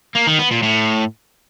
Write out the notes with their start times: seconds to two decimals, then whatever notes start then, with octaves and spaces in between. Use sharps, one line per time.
0.15 A#3
0.27 D#3
0.39 B3
0.51 A#2
0.63 A2